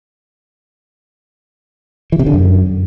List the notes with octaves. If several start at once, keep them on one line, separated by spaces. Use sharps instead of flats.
E3
C3
D3
F#2